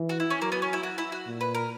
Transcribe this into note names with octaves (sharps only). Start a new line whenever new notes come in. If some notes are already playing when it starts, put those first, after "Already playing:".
Already playing: E3
F#4
E4
C#4
F#3 A#3
B3
C#4
E4
F#4
E4
F#4
A#2
B4
A#4